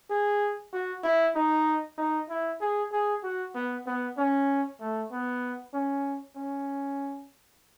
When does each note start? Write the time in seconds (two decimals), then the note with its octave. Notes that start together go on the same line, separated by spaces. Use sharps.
0.11 G#4
0.73 F#4
1.04 E4
1.36 D#4
1.98 D#4
2.30 E4
2.61 G#4
2.93 G#4
3.23 F#4
3.55 B3
3.87 B3
4.18 C#4
4.80 A3
5.12 B3
5.74 C#4
6.37 C#4